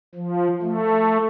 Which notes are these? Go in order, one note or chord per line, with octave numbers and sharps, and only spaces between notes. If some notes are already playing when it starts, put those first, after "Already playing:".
F3
A3